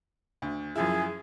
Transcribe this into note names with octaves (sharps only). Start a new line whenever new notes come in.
D2
F#2 F3 E4 G#4